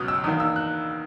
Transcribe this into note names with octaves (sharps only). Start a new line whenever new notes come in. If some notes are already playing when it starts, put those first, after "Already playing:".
Already playing: C#2 B2 F#3 D#6
E6
E2 D#3 A#3 D#6
E6
F#6